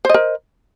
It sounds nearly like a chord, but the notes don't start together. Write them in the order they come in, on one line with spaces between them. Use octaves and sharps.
C5 D#5 A#4